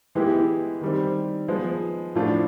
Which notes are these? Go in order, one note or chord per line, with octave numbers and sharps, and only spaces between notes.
E3 G#3 B3 E4 G4
D#3 G3 C4
F3 G#3 B3
A2 F3 A3 D4 F4